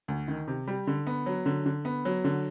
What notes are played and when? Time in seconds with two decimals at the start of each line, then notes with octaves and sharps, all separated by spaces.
0.08 D2
0.28 D#3
0.48 C3
0.67 G3
0.87 D3
1.07 B3
1.26 F#3
1.46 D3
1.66 D3
1.85 B3
2.05 F#3
2.24 D3